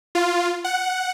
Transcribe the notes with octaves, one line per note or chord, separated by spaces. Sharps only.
F4
F#5